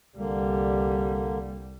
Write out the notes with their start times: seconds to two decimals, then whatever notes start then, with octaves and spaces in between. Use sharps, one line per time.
0.17 C2 D3 G3 A#3